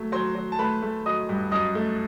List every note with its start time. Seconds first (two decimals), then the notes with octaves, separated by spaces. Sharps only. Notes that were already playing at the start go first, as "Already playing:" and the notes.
Already playing: F#3 A3
0.12 F#3 C5 C6
0.35 F#3
0.52 A5
0.59 A3 B4 B5
0.82 A3
1.06 F#3 D#5 D#6
1.29 G2
1.51 F#2 D#5 D#6
1.75 A3